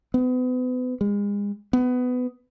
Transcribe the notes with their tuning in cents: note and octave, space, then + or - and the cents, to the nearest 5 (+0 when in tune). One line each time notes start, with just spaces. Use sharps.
B3 +35
G#3 -35
B3 +20